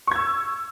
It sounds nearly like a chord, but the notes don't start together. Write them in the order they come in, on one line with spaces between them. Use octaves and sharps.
C#6 G#6 E6